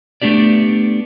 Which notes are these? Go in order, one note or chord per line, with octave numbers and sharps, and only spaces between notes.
A3 B3 D4 G4 D5